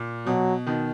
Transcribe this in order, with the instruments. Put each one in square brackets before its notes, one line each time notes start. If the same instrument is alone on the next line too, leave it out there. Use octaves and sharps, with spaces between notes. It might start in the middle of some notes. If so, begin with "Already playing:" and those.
Already playing: [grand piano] A#2
[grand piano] B2 [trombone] F#3
[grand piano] B2 D#3